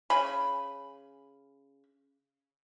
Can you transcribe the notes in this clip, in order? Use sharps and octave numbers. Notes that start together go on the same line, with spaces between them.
C#3 G#5 B5